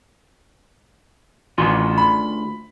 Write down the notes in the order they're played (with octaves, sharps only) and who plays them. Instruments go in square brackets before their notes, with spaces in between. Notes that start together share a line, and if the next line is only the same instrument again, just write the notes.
[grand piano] A1 [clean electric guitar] D2 F4 C6
[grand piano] B5